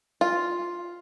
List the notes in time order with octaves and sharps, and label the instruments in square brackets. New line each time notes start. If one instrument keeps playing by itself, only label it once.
[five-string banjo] F4